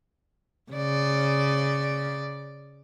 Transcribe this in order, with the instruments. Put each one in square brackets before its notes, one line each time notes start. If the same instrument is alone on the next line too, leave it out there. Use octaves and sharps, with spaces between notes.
[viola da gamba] C#3 D5